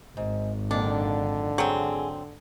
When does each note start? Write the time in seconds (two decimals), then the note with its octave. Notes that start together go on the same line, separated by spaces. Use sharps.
0.17 G#1 G#2
0.71 F2 A#2 D3 D#3 D4
1.58 F#3 C4 G#4